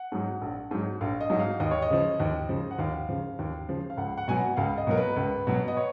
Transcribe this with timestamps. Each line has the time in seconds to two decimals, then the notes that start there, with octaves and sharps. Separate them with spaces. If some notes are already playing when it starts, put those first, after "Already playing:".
Already playing: F#5
0.12 G#2 F#3
0.41 A#1
0.71 G#2 F#3
1.01 A#1 F5
1.21 D#5
1.30 G#2 F#3
1.40 F5
1.60 D#2 D#5
1.71 C#5
1.82 D#5
1.90 C#3 F3
2.20 D#2
2.49 C#3 F3
2.71 F#5
2.79 D#2 F5
3.09 C#3 F3
3.39 D#2
3.68 C#3 F3
3.90 F5
3.97 C#2 F#5
4.17 F#5
4.28 B2 F#3 G#5
4.37 F#5
4.57 C#2 F5
4.78 D#5
4.87 B2 F#3 A#4
4.98 B4
5.16 C#2
5.47 B2 F#3
5.68 D#5
5.77 C#5